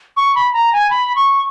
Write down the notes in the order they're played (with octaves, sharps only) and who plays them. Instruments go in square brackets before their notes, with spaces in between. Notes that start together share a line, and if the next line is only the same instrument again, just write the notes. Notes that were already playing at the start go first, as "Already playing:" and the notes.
[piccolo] C#6
B5
A#5
G#5
B5
C#6